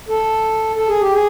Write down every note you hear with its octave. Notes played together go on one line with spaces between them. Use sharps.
A4
A4
G#4
G4
G#4